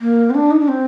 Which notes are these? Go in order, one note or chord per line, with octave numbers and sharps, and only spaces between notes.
A#3
C4
D4
D#4
D4
C4